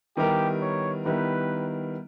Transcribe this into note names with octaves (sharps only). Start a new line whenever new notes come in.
D#3 G3 B3 E4 G4 A#4
C#5
D#3 G3 B3 E4 A#4 B4